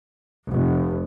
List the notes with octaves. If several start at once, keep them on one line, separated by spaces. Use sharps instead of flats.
F1